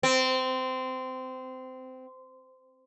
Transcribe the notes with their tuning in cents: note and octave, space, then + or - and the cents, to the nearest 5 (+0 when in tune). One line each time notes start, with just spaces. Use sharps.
C4 -20